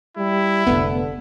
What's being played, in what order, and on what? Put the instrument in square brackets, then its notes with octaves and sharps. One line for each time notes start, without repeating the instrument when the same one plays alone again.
[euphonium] G3 [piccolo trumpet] E4
[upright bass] F1 A3 [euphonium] D3 [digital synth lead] B3